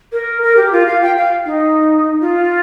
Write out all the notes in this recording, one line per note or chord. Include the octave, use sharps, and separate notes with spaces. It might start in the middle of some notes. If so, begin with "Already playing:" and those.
A#4
A#4
G4
F4
F5
G5
F5
D#4
F4